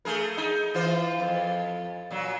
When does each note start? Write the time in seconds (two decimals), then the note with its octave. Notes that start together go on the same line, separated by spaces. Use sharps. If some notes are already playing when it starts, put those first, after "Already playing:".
0.05 A3 G#4 A#4
0.37 D#4
0.74 E3 F4 C5
1.20 F2
2.11 A#2 F#3